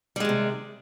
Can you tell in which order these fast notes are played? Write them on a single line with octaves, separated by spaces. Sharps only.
G3 G#3 D#3 C3